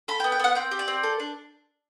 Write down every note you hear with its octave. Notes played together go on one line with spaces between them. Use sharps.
A4 B5
G5
B3
G5
B3 F#5
C4 G5
G4
D5
C4
A4
D4